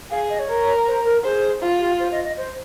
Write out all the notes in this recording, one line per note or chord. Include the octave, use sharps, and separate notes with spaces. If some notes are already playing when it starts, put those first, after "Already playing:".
G#4 F5
D#5
C#5
A#4
C5
A#4
G#4 C5
F4
G4
C5
D#5
D#5
C5